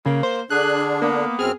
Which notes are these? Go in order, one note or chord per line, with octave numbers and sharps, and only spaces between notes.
C#3 A#3
C5
D3 D4 G#4 F#6
A#3 B3
F#2 C4 G#4 F6